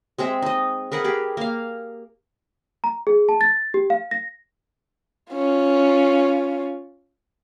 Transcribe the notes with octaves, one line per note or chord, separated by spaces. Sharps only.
G#3 C4 G#4 E5
D#4 D#5
G#4 A#4 B4 F#5
G4 G#4
A#3 F5
A#5
G#4
A5
A6
G4
F5
A#6
C#4 F4